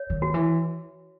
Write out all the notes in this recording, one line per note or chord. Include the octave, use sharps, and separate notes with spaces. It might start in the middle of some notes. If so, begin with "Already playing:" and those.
Already playing: C#5
D#3
F#4
E3